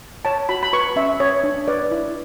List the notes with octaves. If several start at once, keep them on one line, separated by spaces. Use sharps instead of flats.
C#5 A5
F#4 B5
B5
B4 C#6
C#4 E5
C#5
D4
B4 D5
E4